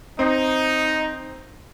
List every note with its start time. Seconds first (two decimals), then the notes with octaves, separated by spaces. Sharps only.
0.19 C4 D#4